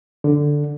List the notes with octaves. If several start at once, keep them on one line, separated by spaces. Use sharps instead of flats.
D3